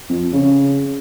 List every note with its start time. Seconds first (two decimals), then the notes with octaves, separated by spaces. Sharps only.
0.10 F2
0.33 C#3